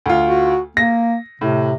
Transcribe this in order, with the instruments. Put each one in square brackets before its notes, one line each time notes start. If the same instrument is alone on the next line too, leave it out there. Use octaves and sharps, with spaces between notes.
[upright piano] D2 F4
[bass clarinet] F#4
[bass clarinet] A#3 [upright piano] A#6
[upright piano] A2 [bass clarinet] C3